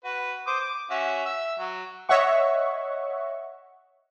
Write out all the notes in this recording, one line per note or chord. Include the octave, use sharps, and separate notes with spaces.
F#4 B4
C5 D6 D#6
D6
C#4 F#4 E5
E5 E6
F#3
C#5 D#5 E5 F#5 C#6